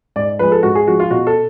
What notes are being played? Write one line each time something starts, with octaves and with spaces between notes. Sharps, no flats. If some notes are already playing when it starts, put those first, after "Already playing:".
G#2 D5
F3 G#3 B4
A4
G#2 F#4
G#4
F3 G#3 F#4
F4
B2 F#4
A4